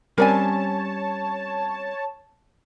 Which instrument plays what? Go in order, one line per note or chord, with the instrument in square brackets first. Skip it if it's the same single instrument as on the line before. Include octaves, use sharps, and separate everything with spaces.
[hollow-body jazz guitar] G3 C4 C#4 [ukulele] A#4 D5 G#5 [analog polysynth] C#5 A5